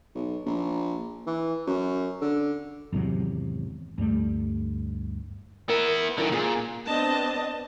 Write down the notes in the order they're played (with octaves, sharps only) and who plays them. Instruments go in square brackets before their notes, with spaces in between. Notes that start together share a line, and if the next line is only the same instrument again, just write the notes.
[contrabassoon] B1
A#1
E3
F#2
D3
[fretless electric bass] G#1 E2 C3 F#3
D2 G2 G3 A3
[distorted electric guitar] B3 E4 [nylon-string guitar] A#4
[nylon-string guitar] F#2 E4 A#4 [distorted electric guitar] D3 D#3
[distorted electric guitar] A#2 [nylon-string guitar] F4 G#4
[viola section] B3 C4 D4 D#5 A5